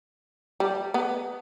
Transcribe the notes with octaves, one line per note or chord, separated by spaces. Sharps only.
G3
B3